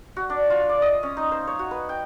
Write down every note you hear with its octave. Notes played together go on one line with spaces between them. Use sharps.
F#4
D4
F4
D5
D#5
C#4
D#4
C5
C#5
F#4
B4
G5